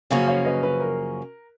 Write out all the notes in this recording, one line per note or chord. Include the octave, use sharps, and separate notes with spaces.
F#2 C#3 F3 A#3 C#4 F5 G#5
C#5 F5
B4 D#5
B4
A#4